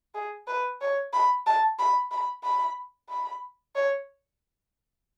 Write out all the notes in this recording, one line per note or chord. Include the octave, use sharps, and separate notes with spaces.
G#4
B4
C#5
B5
A5
B5
B5
B5
B5
C#5